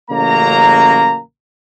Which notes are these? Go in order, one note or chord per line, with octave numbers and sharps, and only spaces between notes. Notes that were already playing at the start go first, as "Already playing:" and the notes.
A1 C#3 F#3 A#3 A#5